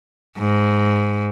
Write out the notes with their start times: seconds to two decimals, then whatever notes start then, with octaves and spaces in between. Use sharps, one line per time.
0.38 G#2